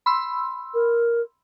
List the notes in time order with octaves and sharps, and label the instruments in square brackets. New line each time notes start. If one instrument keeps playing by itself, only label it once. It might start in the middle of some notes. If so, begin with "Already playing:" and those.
[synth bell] B5 C6 E6
[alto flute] A#4